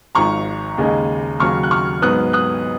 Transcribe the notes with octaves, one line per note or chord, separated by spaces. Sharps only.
G#1 G#2 F3 A#5 C#6
D#2 C#3 G#3 D#4
D#2 C#3 F#3 C#6 F6
F#6
C#6 F6
G#2 F#3 B3 D#6 F#6
D#6 F#6